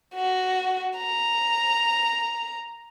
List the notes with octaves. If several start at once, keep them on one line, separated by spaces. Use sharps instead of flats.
F#4
A#5